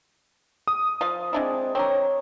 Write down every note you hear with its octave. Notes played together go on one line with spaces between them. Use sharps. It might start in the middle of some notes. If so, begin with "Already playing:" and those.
D#6
F3 F5
G#3 C4 D4 E4
C4 D4 A#4 C#5